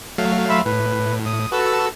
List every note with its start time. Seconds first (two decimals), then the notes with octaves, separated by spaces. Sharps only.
0.18 F#3 A3 F5
0.49 E5 B5 C6
0.66 A2 B4
1.26 D#6
1.52 F#4 A4 B4 A5 E6